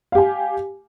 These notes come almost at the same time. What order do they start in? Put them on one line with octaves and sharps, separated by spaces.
F5 G4 G#5